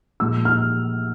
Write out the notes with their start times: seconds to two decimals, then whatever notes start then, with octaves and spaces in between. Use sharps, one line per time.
0.20 A#2 F3 G#3 E6
0.45 F6